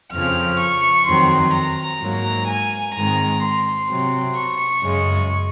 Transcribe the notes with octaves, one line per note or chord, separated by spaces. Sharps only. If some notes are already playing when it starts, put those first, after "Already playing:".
F2 C#3 F3 C4 F6
C#6
F2 D#3 F#3 C4 C6
A#5
G#2 F#3 A#3
G#5
G#2 D#3 G#3 C4 A#5
C6
C3 F#3 C4
C#6
F#2 C#3 G#3